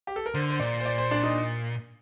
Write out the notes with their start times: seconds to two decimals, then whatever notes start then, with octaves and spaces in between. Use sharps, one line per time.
0.07 G4
0.16 A4
0.26 A#4
0.34 D3 C5
0.51 C5
0.60 A#2 D5
0.80 C5
0.86 D5
0.98 C5
1.11 D4
1.23 D#4